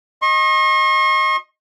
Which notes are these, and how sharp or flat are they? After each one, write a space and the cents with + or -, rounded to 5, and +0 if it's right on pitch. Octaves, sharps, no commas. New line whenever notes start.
D#5 +0 C#6 -45